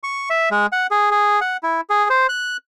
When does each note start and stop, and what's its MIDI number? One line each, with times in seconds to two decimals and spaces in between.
0.03 0.29 85
0.30 0.49 76
0.51 0.66 56
0.72 0.87 78
0.91 1.10 68
1.11 1.40 68
1.41 1.57 78
1.63 1.81 64
1.90 2.08 68
2.10 2.27 72
2.29 2.57 90